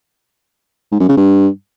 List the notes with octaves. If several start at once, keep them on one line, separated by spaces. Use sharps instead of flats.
G#2
F#2
C#3
G2